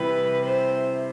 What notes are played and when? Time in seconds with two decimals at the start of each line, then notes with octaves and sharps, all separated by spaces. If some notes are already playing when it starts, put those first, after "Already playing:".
Already playing: C3 E3 G3 B4
0.46 C5